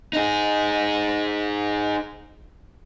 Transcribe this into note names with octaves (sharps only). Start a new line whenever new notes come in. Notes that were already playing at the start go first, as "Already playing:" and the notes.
D#4 G#4